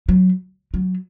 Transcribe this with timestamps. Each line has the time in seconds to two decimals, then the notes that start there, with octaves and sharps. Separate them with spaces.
0.09 F#3
0.74 F#3